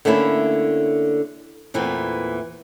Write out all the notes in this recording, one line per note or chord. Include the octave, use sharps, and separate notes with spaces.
D3 A3 A#3 C#4 E4
E2 A#2 E3 A3 B3 C4